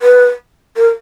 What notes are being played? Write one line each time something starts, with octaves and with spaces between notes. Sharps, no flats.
B4
A#4